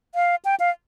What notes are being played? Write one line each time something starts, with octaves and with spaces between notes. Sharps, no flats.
F5
G5
F5